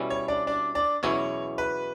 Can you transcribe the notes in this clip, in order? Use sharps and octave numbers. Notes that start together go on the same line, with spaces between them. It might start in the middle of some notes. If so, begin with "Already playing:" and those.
Already playing: B2 G3 C#4 E4
C#5
D4 D5
D4 D5
D4 D5
E2 B2 F#3 C#4 E4 C#5
B4